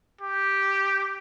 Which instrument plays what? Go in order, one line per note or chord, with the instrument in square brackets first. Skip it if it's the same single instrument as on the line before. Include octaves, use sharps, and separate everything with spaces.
[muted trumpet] G4